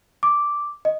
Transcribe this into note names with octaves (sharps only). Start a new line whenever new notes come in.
D6
D#5